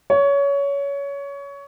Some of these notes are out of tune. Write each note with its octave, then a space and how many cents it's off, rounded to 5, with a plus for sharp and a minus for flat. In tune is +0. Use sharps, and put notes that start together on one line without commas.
C#5 +20